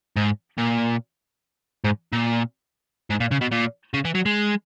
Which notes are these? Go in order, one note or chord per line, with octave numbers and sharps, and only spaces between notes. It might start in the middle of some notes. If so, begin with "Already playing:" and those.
G#2
A#2
G#2
A#2
G#2
A#2
C#3
B2
A#2
C#3
E3
F#3
G#3